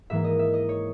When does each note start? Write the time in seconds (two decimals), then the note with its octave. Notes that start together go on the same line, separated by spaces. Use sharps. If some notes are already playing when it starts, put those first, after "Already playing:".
0.10 G#2 E3 A#3 E5
0.24 D#5
0.39 E5
0.54 D#5
0.69 C#5